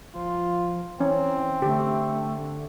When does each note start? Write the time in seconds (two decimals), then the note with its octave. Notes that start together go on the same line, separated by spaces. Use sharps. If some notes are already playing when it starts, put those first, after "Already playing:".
0.15 F3 F4
1.00 E3 C4 C#4
1.62 D3 A3 G4